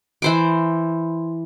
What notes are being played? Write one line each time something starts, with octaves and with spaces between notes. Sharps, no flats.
E3 C5 D6